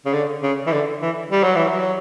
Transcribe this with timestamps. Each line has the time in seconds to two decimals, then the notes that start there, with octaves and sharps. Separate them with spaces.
0.05 C#3
0.13 D3
0.43 C#3
0.66 E3
0.72 D3
1.02 E3
1.31 G3
1.43 F#3
1.56 E3
1.68 F#3